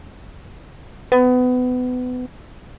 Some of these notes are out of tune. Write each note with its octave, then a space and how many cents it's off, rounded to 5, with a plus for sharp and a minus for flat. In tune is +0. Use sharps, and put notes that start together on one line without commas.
B3 +25